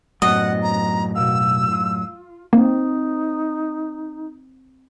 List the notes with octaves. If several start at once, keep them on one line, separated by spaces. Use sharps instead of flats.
F#2 A2 F#3 B3 C4 D4 D#5 F#5
A#5
B2 A#4 F5 E6
F4
A#3 C4 D#4